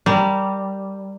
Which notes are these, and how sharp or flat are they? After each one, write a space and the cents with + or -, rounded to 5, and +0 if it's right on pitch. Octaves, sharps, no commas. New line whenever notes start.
G3 -10 A#4 -25